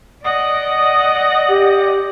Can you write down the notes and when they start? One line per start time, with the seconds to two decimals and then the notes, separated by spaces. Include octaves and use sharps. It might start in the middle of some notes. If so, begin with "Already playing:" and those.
0.25 D5 D#5 F#5 D#6
1.49 G4